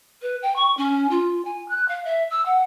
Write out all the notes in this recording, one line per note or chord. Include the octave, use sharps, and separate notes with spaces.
B4
G5
C#6
C#4
F4
G#5
F#6
F5
E5
E6
F#5